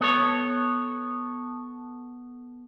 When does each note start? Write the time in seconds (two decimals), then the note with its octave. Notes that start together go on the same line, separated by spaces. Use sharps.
0.01 B3 A4 C#5